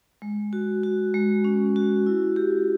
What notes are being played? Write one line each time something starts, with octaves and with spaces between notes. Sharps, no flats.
G#3
F#4
F#4
G#3
C#4
F#4
E4
G4